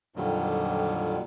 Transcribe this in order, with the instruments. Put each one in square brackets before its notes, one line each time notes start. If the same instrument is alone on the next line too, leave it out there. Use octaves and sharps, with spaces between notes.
[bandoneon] F2 A#2 D3 D#3 F#3 G3